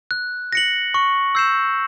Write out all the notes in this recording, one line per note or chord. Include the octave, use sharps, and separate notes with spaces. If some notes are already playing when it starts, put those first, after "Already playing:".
F#6
A#6 C#7 F#7
C#6
E6 G6 C7 E7